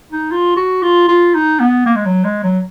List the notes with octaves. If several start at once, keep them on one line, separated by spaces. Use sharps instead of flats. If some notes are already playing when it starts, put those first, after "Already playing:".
D#4
F4
F#4
F4
F4
D#4
B3
A#3
G#3
F#3
G#3
F#3